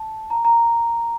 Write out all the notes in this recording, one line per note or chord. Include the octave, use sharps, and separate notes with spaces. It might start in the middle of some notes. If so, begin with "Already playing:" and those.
Already playing: A5
A#5
A#5